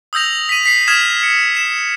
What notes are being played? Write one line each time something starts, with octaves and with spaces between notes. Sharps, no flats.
D#6 E6 G6 A#6 F7
B6 D#7
B6 C7
D#6 F6 G#6 B6 E7
C#7
C7 E7